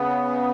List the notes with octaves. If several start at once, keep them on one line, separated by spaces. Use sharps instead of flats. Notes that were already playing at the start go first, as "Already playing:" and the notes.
Already playing: C#3 B3